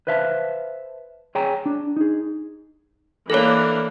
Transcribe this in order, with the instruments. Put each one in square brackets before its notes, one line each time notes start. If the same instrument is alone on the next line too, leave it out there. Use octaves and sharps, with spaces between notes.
[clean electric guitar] B4 C5 E5 F5 A5
G#4 C#5 G5 G#5 A#5
D4
D#4 G#4
[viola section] E3 A#3 D4 [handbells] A4 C#5